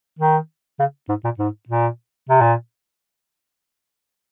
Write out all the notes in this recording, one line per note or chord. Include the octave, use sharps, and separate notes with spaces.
D#3
C#3
G#2
A#2
G#2
A#2
C3
A#2